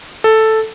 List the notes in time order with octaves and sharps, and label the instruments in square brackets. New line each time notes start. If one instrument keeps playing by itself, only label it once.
[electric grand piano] A4